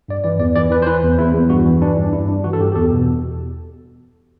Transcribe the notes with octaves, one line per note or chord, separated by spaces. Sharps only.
G2 D5
E3 D5
E2 D5
E3 D5
E3 B4
C5
E3 B4
E2
E2 E4
E2
G2 F#4
E3
E3 D4
G2
D4
G2 E4
G2 D4
E3 F#4
A4
G2 G4
G4
E2 A4
B2